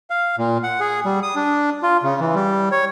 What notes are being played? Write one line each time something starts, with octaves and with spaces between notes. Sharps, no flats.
F5
A#2
F#5
G#4
G3
D#6
D4
F4
C#3
E3
G3
C#5